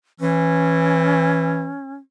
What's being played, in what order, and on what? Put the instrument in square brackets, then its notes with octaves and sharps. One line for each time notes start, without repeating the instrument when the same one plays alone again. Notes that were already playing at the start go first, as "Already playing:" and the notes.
[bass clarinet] E3 [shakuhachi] C#4